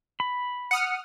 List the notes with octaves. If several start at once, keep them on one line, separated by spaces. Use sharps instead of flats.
B5
F#5 D#6 F6 C#7